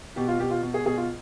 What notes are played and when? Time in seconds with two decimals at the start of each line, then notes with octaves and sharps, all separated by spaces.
0.16 B2 G4
0.28 F4
0.39 B2 G4
0.51 F4
0.63 B2
0.74 G#4
0.86 B2 G#4
0.97 F4